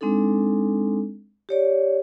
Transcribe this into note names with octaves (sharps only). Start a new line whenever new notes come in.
G#3 C4 D4 D#4 A4
G4 C#5 D5